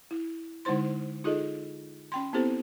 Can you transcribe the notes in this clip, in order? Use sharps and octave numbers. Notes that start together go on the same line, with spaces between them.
E4
D3 G#3 D#4 E4 C5 C6
D#4 F4 G#4 A4 D#5
C#4 G5 C6
B3 C4 E4 G4 A4 C5